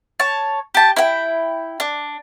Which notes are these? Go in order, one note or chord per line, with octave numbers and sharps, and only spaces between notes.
C#5 A5
G4 A5
E4 G5
D4